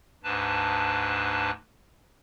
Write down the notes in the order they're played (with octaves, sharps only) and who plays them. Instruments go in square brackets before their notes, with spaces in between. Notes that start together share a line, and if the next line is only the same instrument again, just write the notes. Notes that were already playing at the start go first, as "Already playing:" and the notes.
[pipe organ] D2 G#2 D4 B4 A5